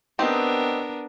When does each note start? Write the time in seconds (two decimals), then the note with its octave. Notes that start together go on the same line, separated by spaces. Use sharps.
0.19 B3 C4 D4 D#4 G4 A#4